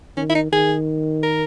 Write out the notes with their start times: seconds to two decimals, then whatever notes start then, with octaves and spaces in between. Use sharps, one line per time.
0.17 D#3 C#4
0.29 E4
0.35 D#4
0.52 D#3 G#4
1.23 A#4